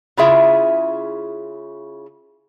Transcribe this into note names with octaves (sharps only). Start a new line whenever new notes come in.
C#3 E4 F4 G#4 E5